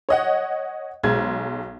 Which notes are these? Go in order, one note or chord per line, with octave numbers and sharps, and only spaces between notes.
C#5 D#5 F#5
B1 G#3 G#6